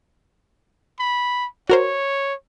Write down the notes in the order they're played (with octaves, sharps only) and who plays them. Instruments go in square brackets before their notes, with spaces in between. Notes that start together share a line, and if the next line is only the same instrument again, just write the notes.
[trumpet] B5
[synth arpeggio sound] F#4 A#4 C5 [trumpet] C#5